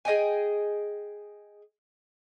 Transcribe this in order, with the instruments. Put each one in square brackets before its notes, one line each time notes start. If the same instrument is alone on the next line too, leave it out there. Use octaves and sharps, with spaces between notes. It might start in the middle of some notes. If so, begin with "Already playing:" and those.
[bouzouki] G#4 D#5 G5 G#5